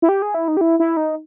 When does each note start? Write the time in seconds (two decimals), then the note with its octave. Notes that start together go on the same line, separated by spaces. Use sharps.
0.02 E4
0.09 G4
0.22 G#4
0.34 E4
0.48 D#4
0.57 G4
0.61 E4
0.80 E4
0.97 D#4